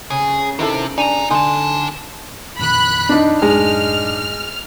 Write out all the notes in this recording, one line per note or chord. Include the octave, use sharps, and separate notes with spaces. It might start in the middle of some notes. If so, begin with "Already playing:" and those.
C#3 G#4
C3 D#3 E4 A4
D4 D#4 G#5 A#5 D#7 F7
D3 D#4 G#5 A5 C6
F2 A#2 D#3 B5 F#6
D4 D#4
F#2 A2 G#3 F6